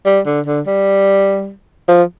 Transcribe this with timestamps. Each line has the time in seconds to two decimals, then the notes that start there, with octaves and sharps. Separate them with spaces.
0.06 G3
0.26 D3
0.47 D3
0.66 G3
1.88 F3